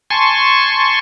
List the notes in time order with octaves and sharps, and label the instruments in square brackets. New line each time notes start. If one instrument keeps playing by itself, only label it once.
[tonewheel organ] G#5 A5 C6 C#6